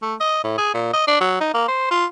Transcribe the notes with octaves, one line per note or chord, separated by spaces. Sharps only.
A3
D#5
A2
G#4
A#2
D#5
D4
F#3
D#4
A#3
C5
F4